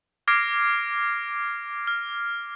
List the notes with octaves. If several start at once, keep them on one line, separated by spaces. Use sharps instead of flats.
D6 F6 G#6 A#6 C7 D7
F6